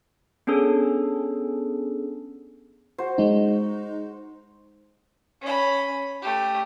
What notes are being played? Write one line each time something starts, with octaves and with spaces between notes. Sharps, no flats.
B3 C#4 D4 G#4 A4
F#4 C5
G#3 D#4
C#4 B5
A3 G4